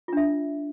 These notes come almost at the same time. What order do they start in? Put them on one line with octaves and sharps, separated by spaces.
F4 D4 E5